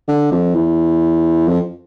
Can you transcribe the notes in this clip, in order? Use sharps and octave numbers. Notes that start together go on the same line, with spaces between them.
D3
F2
E2
F2